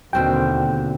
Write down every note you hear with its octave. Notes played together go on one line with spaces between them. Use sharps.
D#2 B2 D3 C4 F#4 G5